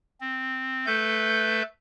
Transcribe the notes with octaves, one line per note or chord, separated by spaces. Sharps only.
C4
A3 A4 B4 G6